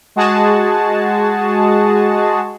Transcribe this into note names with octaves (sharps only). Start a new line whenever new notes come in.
G#3 F#4 G#4 A5